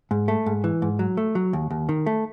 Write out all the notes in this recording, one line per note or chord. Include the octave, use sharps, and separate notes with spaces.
G#2
A3
G#2
E3
G#2
F#3
A3
F#3
D#2
D#2
D#3
A3